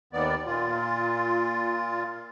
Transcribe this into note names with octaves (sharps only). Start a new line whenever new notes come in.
D#2 D#3 B3 D5
A#2 F4